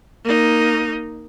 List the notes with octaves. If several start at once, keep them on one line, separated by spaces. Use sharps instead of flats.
A#3 D#4